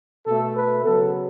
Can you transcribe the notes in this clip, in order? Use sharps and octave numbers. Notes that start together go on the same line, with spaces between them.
B2 A3 A4
B4
C#3 F#3 B3 A4